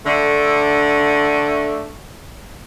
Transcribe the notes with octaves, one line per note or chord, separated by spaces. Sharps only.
D3 A3